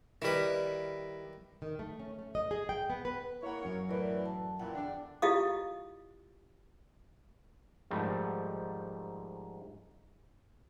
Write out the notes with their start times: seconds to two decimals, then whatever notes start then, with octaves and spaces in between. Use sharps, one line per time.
0.22 D#3 G3 E4 B4
1.62 D#3
1.79 A3
1.99 C#4
2.19 A3
2.35 D#5
2.51 G#4
2.69 G5
2.90 B3
3.05 B4
3.43 A#3 E4 C#5 F#5
3.65 F#2
3.89 A2 E3 A#4 B4 D5
4.26 A5
4.60 A#2 E3 F#5 G5
4.75 E2 D3 D4
5.22 E4 F4 G4 D#5 F5 D#6
7.91 G#2 D#3 F3 G3 A3